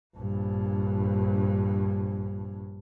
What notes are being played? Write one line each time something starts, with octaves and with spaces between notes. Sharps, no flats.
A#1 G2